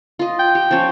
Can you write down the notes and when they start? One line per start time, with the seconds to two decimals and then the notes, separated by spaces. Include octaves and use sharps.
0.19 F4 D#5
0.39 G5
0.55 G4
0.71 F3 C#4